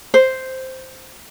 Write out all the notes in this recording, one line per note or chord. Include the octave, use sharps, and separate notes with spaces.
C5